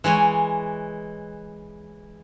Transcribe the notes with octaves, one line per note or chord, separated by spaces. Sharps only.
E3 G#3 C#5 G#5